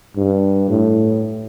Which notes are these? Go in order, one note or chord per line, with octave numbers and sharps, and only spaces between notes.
G2
A2